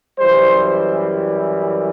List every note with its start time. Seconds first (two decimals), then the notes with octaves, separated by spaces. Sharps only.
0.19 F#2 E3 G3 C5